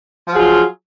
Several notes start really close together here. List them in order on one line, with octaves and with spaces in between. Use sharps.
F3 F#3 G#4 F4